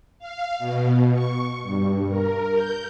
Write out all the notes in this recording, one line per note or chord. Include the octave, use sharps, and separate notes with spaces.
F5
B2
C#6
G2
A#4
G6